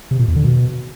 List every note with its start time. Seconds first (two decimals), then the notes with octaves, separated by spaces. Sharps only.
0.11 C3
0.19 A#2
0.28 E2
0.36 D3
0.45 B2